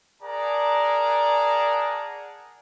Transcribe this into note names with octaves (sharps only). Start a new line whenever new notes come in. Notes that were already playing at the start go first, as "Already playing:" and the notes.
G#4 A#4 D5 F#5 A5 A#5